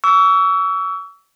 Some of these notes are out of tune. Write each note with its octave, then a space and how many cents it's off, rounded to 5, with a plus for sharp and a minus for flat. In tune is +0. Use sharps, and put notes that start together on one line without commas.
C#6 +40 E6 +0